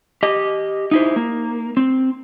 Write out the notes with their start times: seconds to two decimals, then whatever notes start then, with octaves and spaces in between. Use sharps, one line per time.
0.23 G4 D#5
0.91 D#4 E4 C5
1.16 A#3
1.77 C4